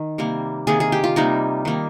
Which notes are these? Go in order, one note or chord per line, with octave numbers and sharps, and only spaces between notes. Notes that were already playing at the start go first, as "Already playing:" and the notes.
Already playing: D#3
C3 G3 A#3
C3 D#3 A#3 G#4
G#4
G4
F4
C3 G3 A#3 D#4
D#3 G3 A#3